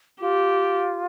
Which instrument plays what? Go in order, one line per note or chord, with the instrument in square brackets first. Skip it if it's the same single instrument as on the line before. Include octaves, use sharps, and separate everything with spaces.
[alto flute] F4 [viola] G4